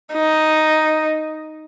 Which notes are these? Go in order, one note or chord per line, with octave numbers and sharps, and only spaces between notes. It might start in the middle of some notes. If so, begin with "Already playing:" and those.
D#4